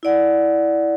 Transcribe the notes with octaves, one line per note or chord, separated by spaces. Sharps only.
E4 D5 F#5